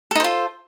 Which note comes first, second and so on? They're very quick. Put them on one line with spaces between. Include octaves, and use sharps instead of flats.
A4 D#4 C5 F4